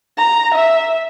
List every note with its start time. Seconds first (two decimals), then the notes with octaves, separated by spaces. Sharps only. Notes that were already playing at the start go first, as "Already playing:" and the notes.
0.17 A#5
0.54 E5